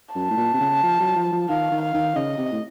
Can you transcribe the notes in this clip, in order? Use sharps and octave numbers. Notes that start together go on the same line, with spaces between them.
F#2 A5
A2
A#2
C3
C#3
F3
F#3
F3
F3
D#3 F5
D#3
F5
D#3
C#3 D#5
C3
A2